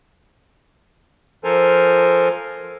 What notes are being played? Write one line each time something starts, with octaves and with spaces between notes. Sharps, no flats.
F3 A4 A#4 C5 G#5 F6